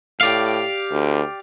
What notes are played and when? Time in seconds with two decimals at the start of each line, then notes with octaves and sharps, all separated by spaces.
0.21 A2 G4 D5 F5
0.91 D2